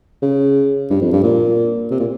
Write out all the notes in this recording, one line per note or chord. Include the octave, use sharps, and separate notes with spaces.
C#3
G2
F2
G2
A#2
C3
A#2